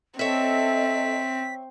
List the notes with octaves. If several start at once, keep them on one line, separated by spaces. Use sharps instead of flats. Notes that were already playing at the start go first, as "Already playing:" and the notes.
C4 A4 C#5 D#5 E5 B6